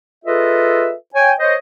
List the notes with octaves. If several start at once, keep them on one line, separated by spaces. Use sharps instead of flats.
F4 G#4 A4 B4 D#5 E5
C#5 G5 G#5
C5 C#5 D#5